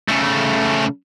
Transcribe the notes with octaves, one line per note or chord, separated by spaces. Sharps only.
C#3 A3